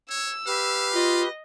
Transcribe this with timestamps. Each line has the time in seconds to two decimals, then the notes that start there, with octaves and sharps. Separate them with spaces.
0.10 C#5 E6
0.47 G4 B4 F5
0.93 F4 D#5